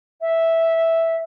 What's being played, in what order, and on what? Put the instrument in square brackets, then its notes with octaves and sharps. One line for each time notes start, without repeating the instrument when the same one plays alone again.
[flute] E5